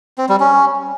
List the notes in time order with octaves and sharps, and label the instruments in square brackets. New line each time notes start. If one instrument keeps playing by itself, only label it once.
[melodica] C4
G3
C#4